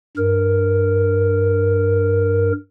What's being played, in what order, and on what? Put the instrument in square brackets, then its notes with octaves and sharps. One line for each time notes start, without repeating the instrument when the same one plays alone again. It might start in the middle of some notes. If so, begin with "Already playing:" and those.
[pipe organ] G2 A#4